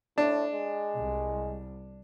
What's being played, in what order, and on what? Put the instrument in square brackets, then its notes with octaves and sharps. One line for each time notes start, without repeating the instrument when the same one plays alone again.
[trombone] A2 [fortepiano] D4
[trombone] G#3
[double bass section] C2